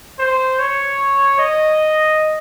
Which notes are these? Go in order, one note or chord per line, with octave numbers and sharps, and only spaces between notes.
C5
C#5
D#5